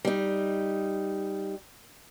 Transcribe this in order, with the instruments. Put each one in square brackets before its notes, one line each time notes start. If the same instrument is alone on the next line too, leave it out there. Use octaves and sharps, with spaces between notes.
[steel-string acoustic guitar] G3 D#4